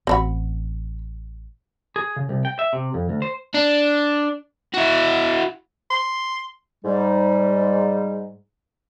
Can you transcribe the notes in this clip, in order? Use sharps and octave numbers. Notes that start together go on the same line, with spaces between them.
A1 C4 F#4 B5
G#4
C#3
C2
G5
E5
C3
F2
D2
C5
D4
E4 F#4
C6
G#2 G3